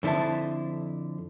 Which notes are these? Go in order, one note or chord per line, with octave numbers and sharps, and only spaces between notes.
F2 D3 E4 C5 A5